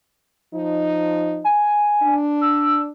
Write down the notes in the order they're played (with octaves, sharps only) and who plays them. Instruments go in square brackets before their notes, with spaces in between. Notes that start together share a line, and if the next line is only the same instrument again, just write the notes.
[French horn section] F3 D#4
[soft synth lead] G#5
[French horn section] D4
[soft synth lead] E6